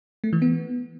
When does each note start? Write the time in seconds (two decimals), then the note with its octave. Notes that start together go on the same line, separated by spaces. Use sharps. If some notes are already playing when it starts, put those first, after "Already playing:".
0.24 A3
0.33 E3
0.42 B3